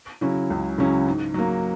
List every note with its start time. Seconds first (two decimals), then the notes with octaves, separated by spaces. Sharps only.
0.21 C#3 F#3 C#4 E4
0.50 C#2
0.78 C#3 F#3 C#4 E4
1.07 G#2
1.34 F#3 A#3